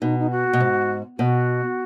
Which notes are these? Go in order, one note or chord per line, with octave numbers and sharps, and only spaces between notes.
B2 D#4
D#4
F#4
B2
G#2
B2 F#4